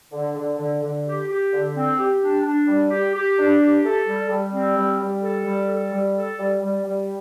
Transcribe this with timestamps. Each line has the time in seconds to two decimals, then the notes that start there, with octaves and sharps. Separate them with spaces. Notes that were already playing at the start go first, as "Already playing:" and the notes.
0.12 D3
0.36 D3
0.59 D3
0.83 D3
1.06 G4
1.29 G4
1.52 D3
1.76 C4
1.98 G4
2.22 D4
2.45 D4
2.67 G3
2.91 G4
3.14 G4
3.38 D4
3.60 G4
3.84 A4
4.07 G3
4.30 G3
4.53 C4
4.76 G3
5.00 G3
5.23 A4
5.46 G3
5.69 A4
5.92 G3
6.15 A4
6.38 G3
6.61 G3
6.85 G3